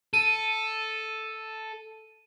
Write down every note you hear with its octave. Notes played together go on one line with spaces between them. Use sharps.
A4 D#7